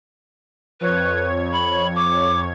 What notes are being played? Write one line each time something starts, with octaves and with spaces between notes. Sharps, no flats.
F2 B4 C#5 G#6
B5
D6